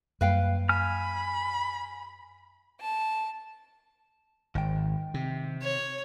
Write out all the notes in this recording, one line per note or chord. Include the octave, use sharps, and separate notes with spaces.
F#2 G3 A#3 B4 F5 G5
G#5 B5 F6
A5
G#1 D#3 G5
C3
C#5